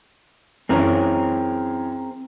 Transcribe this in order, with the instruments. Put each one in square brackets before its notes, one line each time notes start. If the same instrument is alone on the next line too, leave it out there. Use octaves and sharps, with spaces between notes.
[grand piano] F#2 E3 C#4 [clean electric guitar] C4 G#4 A#4